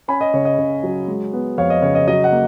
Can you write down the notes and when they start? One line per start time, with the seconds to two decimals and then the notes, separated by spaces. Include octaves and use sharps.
0.08 C#4 G#5 B5
0.21 D#5
0.34 C#3 C#5
0.45 D#5
0.58 C#3
0.83 F#3
1.08 G#3
1.33 B3
1.58 F2 C#5 F5
1.70 D#5
1.82 C#3 C#5
1.95 D#5
2.08 F#3 D#5
2.24 D#5 F#5
2.32 A#3